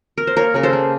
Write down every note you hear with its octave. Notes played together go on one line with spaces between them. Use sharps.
A#4
C5
A#3 A#4 C#5
C#3 A#4
A4 C5
A#3